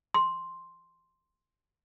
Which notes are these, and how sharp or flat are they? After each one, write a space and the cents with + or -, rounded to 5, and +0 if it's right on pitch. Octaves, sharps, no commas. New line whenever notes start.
C6 +0